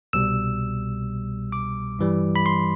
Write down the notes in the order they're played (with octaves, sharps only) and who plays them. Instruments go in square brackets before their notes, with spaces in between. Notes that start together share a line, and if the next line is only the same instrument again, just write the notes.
[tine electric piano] C2 B2 G3 E6
D6
G2 E3 G3
B5
C6